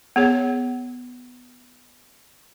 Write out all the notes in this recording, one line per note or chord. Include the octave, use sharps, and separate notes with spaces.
B3 G#4 C#5